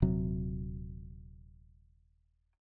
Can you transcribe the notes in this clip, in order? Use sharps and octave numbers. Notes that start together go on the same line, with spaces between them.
D#1 C3 F#3